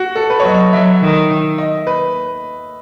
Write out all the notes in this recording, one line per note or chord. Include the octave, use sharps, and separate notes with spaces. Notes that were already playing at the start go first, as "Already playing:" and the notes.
Already playing: F#4
A4
B4
C#5
F#3 D#5
F#3 E5
D#3
D#5
B4